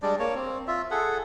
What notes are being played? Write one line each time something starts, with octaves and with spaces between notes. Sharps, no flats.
G3 G#3 D4 D5
A#3 C#5
C4
F4 E5
G#4 A4 F#5